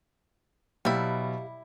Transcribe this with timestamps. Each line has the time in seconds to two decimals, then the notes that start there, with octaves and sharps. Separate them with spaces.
0.85 B2 F#3 G3 E4 G4 E5 F5